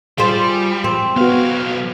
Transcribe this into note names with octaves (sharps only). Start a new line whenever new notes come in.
G3 F4 G#4 C5
C4
B1 B3 F#4 F5